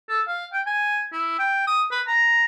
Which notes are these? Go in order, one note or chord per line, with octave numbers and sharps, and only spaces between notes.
A4
F5
G5
G#5
E4
G5
D#6
B4
A#5